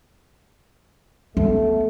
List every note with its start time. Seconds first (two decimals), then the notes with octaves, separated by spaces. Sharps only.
1.37 A3 B3